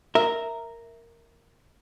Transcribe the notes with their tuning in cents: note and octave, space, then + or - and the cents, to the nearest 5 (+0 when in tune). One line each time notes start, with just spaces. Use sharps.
A#4 -5 E5 -10